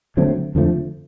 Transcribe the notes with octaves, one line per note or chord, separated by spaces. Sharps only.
D3 F#3 A3 C4
F2 D3 F3 A3